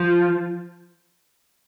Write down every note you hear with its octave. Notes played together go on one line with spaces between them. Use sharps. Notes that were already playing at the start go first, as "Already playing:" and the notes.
Already playing: F3